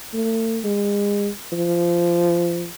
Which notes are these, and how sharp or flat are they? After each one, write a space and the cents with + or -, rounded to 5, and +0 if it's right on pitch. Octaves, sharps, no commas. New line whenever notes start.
A3 +40
G#3 -35
F3 -20